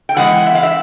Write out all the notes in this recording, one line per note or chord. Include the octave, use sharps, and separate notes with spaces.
G5
E3 G#3 B3 F#5
E5
F5
E5